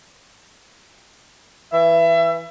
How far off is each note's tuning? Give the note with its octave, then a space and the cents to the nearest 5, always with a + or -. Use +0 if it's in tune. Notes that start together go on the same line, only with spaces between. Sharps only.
E3 +0 E5 +30